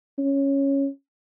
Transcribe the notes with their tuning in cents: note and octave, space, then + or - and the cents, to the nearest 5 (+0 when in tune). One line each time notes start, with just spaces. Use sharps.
C#4 -5